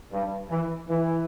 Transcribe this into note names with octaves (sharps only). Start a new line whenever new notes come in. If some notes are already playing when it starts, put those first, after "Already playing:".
G2
E3
E3